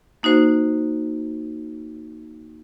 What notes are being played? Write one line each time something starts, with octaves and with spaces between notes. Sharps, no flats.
A#3 D#4 F#4 C5